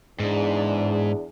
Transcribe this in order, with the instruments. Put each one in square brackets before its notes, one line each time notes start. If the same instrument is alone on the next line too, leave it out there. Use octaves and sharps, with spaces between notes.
[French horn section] E2 D4 G#4 [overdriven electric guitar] G#2